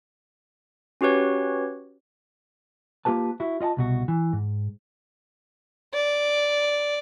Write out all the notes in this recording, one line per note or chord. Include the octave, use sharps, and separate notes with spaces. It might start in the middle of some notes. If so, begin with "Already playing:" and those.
C#4 F#4 G4 B4 C#5
A#3 F4 G4 B4 A5
E4 F#4
F4 D#5 F#5 A5
C2 B2 F#4
E3
G#2
D5